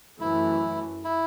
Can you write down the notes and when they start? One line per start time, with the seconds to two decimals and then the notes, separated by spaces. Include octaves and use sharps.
0.20 F#2 E3 A3 E4
1.04 E4